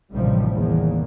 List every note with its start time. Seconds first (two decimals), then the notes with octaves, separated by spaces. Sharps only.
0.12 A1 C3 D#3 F3 G3
0.53 E2 D#3 A#3